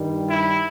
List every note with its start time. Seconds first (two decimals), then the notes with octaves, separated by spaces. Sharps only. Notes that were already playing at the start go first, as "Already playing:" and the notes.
Already playing: G2 D#3 G3
0.28 E4